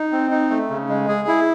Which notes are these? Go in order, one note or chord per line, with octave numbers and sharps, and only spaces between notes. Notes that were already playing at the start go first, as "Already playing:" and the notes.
Already playing: D#4
C4
D#4
A3
C#3
G#3
G#4
E4